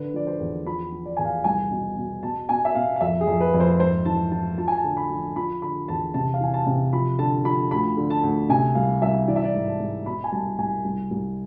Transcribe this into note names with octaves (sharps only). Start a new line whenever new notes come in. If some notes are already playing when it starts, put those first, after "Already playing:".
Already playing: D3 B4
F3 D5
C5
E2
F3 B5
F3
D5
E2 G#5
F5
C2 G#5
B2
B2
B2 A5
B2 G#5
E5
B2 F5
F5
F2 E5
G#4
F2
B4
F2
C5
G#2 C5
E3 A5
E3 A5
F3 A5
G#5
A5
D3
B5
F3
F3 B5
D3 B5
E2 A5
C3 A5
F5
E3 G#5
A5
C3
F3 B5
D3 A5
F3 B5
D2 B5
D3
A5
D2
C3 G#5
C2 F5
C2 E5
E3 D5
E5
D5
G#2
A5
G#2
B2 B5
G#5
C2 A5
C2 G#5
C2
C2